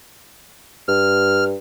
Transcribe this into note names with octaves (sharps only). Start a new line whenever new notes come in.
G2 F6